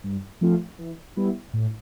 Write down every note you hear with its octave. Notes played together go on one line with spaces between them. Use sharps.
G2
F3 A3 C4 F4
E3
G3 B3 E4
A2